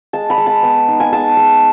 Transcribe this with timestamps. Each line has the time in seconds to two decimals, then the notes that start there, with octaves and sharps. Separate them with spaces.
0.13 G#3 A5
0.30 B5
0.38 G#3
0.47 A5
0.63 B3
0.88 D#4
1.00 G#5
1.12 G#3 A5
1.37 G#3